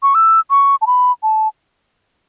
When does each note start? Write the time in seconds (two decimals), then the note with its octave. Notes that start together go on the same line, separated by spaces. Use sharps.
0.03 C#6
0.15 E6
0.50 C#6
0.81 A5
0.87 B5
1.23 A5